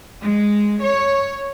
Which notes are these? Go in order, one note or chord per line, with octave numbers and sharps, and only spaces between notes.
G#3
C#5